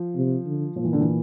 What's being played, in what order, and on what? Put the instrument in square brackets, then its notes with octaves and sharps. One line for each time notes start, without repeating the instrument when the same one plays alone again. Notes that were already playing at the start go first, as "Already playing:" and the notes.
Already playing: [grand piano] F3
[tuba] C3
D3
[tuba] A#2 [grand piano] F3
[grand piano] E3
D3
E3